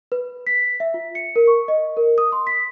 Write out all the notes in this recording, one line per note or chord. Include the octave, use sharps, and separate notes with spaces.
B4
B6
E5
F4
C#7
A#4
C#6
D#5
A#4
D#6
C6
B6